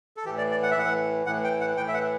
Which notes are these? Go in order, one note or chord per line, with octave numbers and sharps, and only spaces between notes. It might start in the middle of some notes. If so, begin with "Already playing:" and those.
A4
A2 E3 G4
D5
D5
F#5
E5
A2 E3 F#5
A2 E3 F#5
G5
F#5
A2 E3 G5
E5
F#5